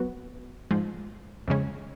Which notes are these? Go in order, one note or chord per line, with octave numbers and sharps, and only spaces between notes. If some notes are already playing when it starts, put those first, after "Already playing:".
Already playing: F#3 B3 F#4 B4
G#2 F3 G#3
F2 C#3 G#3 C#4